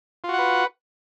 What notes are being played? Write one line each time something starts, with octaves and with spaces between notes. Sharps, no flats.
F4 F#4 B4 F#5